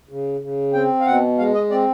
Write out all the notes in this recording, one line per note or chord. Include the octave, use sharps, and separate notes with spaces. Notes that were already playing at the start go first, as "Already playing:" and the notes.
C#3
C#3
C4 G5
F5
B2 F#5
G#3 F5
D#5
C4 D5